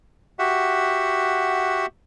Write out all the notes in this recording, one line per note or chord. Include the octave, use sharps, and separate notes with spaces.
F#4 G4 E5 F#5